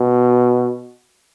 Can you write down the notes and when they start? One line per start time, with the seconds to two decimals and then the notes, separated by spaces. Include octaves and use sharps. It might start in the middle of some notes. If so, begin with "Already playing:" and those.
Already playing: B2